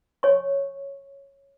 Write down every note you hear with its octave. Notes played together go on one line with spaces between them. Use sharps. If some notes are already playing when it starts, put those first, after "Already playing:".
C#5 G#5 C#6